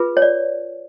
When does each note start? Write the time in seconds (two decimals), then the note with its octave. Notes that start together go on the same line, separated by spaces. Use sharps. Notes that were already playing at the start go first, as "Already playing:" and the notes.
Already playing: F4 G#4 B4
0.17 C#5
0.22 D5